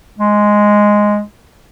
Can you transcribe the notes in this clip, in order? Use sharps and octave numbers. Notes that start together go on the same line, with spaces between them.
G#3